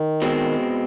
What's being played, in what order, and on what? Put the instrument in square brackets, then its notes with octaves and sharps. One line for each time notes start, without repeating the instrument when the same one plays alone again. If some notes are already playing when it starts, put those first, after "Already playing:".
Already playing: [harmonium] D#3
[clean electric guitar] B2 G#3 C4